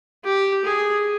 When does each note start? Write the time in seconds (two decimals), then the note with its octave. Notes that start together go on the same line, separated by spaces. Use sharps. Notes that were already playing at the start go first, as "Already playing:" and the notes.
0.25 G4
0.64 G#4